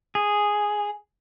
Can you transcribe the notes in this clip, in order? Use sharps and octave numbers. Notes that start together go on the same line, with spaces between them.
G#4